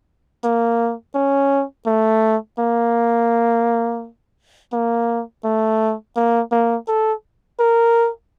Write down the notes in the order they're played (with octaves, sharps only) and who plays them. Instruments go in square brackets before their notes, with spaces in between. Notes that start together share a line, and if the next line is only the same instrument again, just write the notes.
[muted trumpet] A#3
C#4
A3
A#3
A#3
A3
A#3
A#3
A4
A#4